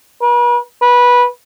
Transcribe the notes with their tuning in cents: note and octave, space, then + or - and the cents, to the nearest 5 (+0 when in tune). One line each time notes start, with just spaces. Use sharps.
B4 -40
B4 -15